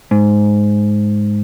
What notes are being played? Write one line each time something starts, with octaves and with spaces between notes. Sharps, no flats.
G#2